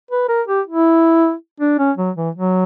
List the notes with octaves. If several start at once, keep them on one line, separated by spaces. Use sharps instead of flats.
B4
A#4
G4
E4
D4
C#4
F#3
E3
F#3